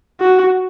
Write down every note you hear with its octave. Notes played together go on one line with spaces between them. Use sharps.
F#4